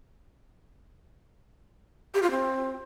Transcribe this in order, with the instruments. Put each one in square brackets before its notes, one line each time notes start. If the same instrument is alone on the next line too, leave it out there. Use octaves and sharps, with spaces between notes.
[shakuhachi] G4
F4
C4